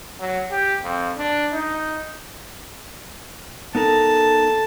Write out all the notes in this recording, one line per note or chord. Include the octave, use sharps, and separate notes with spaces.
F#3
G4
F2
D4
D#4
B3 D#4 A4 A#4 A5